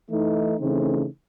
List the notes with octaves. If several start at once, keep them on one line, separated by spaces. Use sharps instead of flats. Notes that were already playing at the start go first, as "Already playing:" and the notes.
E3 A3 D#4
C#3 E3 A3 C4 D#4